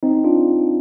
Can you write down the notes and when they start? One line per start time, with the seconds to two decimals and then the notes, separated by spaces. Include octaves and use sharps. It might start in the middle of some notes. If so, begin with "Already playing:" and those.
0.03 C4 D#4
0.24 D4 F4